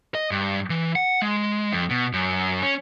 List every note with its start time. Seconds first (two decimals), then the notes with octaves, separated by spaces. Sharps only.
0.15 D#5
0.31 G2
0.70 E3
0.96 F#5
1.22 G#3
1.72 F2
1.90 B2
2.13 F#2
2.63 C#4